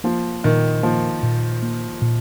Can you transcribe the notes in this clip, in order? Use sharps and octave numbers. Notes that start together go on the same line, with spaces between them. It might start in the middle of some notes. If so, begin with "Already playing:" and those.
F3 A#3
A#2 D#3
F3 A#3
A#2
A#3
A#2